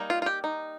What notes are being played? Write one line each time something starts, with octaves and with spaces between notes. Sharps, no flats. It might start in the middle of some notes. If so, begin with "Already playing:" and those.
Already playing: G3 A#3 D#4
F4
F4
G4
D#4